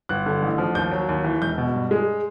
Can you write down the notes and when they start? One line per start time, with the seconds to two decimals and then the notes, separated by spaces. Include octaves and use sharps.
0.09 G1 F#6
0.26 D3
0.42 A1
0.58 F3
0.75 D#2 G6
0.91 F#3
1.09 D#2
1.24 E3
1.41 E1 G6
1.58 B2
1.74 G2
1.91 G#3